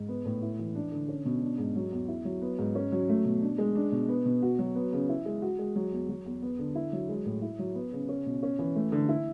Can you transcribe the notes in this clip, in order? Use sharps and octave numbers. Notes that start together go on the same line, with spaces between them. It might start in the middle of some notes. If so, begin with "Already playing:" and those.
Already playing: G#2
B3
A2
E4
E3
D4
D3
C#4
B2
D4
G#2
F#3
E2
E4
F#3
B3
G#2
C#4
F#3
A3
B2
D4
G#3
D4
B2
B3
B2
F#4
F#3
B3
C#3
E4
G#3
F#4
G#3
F#3
E2
F#3
E2
B3
D3
E4
F#3
G#3
A2
E4
F#3
B3
C#3
C#4
B2
C#4
E3
A3
D3
E4